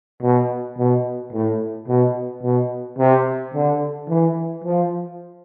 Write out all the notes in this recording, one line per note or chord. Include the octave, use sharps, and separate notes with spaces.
B2
B2
A2
B2
B2
C3
D3
E3
F3